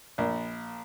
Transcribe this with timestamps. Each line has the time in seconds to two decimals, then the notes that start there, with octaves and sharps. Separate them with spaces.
0.18 A#1